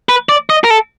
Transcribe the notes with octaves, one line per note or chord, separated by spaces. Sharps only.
B4
D5
D#5
A#4
A4